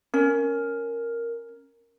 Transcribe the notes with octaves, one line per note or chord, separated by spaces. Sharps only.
C#4 A#4